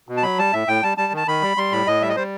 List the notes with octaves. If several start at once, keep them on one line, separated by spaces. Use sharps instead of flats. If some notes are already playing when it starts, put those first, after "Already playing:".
B2
A5
F#3 B5
G3 A5
A2 E5
A2 G5
G3 A5
G3 A5
D#3 A5
D#3 B5
G3
G3 C6
A2 B5
A2 D#5
G3 E5
D#5
G3 C5